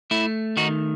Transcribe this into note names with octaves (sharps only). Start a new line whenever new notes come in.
A3 E4
D#3 D#4 F#4